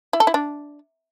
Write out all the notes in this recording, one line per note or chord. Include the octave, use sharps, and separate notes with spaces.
E4
A4
E4
D4